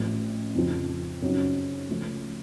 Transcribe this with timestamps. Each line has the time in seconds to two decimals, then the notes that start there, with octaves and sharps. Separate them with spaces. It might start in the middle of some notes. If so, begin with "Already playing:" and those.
Already playing: A1 A2 F3
0.55 F2 C#3 F3
1.22 F#2 C#3 F#3 C4 D#4
1.89 C#2 C#3 F3 A3